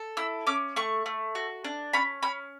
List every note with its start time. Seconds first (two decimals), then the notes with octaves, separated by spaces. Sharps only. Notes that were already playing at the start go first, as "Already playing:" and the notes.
Already playing: A4
0.17 E4 E6
0.47 C#4 D6
0.76 A3 C#6
1.06 A3
1.35 F#4
1.64 D4
1.93 C#4 B5
2.23 C#4 B5